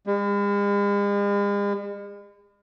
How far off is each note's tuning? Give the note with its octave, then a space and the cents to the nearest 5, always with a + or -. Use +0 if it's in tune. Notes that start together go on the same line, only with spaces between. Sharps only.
G#3 -45